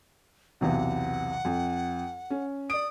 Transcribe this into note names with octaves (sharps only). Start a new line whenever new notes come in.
B1 E2 C3 F#5
F2
C#4
D5 D#6 D7